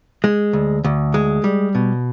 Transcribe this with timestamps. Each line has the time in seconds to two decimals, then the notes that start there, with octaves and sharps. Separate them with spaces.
0.24 G#3
0.53 D2
0.84 D2
1.14 G#3
1.44 G3
1.75 B2